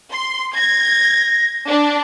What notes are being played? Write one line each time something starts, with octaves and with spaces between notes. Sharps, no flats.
C6
G#6 A#6
D4